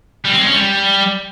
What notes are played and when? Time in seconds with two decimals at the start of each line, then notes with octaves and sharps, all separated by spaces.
0.25 G3
0.32 C4
0.39 G#3
0.47 C#4
0.54 G3